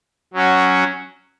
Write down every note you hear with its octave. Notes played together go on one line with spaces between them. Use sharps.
F#3 C#4 F#4